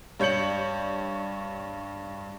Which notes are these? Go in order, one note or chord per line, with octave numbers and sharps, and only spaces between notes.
G2 C#5 G6 C#7 F#7